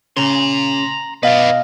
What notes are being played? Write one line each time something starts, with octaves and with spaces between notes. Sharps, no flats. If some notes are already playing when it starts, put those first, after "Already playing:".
C#3 A#5 C6
B2 B4 D5 D#5 F5